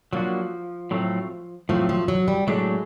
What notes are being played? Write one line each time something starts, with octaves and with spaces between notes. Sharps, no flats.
F3 F#3 A#3 D4 F#4
A2 F#3 A3 C4
A2 F3 F#3 A3 C4
F3
F#3
G3
A2 F#3 G#3 A3 D4